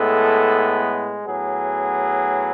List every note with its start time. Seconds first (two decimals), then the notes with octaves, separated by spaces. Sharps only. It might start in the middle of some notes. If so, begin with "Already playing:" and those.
Already playing: A2 G#3 B3 A4
1.25 A2 F#3 B3 G#4